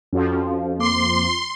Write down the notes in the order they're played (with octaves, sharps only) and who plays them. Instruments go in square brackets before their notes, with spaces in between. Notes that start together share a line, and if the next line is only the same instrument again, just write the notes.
[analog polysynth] F2 F3 [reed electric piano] C#4 F#4 A4
[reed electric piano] A#3 D6 [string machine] C6